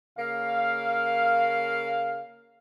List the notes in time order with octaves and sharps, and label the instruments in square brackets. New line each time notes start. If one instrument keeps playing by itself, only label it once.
[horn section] C#3 A#3 F5